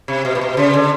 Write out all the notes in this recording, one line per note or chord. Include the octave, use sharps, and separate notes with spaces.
C3
B2
A#2
B2
C#3
D3